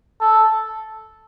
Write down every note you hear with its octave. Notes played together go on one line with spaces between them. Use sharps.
A4